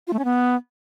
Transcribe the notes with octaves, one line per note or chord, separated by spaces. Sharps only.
F4
A3
C#4
B3